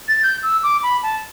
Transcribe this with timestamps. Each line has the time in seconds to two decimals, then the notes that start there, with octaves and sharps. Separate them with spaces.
0.08 A6
0.23 G6
0.43 E6
0.63 D6
0.83 B5
1.03 A5